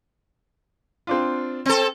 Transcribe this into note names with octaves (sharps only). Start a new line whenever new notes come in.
C4 D4 F4
C4 A4